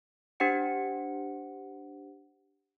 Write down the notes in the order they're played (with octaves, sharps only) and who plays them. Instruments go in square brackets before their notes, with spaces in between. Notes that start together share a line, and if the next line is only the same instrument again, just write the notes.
[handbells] D4 G4 C5 F#5 C#7